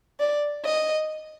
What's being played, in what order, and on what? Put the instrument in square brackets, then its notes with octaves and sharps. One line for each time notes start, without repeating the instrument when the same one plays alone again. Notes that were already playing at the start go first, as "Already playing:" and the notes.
[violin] D5
D#5